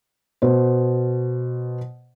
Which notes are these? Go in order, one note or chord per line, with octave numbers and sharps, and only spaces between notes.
B2 C5